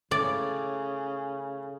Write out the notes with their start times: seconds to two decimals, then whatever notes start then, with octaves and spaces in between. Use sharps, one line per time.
0.11 A2 C#3 D5